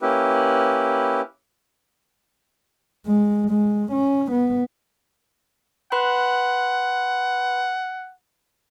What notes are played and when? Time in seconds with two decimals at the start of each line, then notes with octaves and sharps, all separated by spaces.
0.02 A#3 C#4 E4 G4 B4
3.06 G#3
3.51 G#3
3.92 C#4
4.31 B3
5.92 B4 F#5 B5 C6